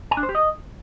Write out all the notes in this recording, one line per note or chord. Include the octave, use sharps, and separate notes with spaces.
G#5
D4
C5
G4
D#5